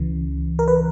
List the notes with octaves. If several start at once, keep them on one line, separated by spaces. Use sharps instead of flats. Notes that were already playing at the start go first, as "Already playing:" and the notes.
Already playing: C#2 C#3 E3
A#4
B4